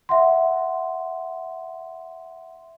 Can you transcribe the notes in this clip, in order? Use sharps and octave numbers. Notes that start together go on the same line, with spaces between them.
E5 F#5 C6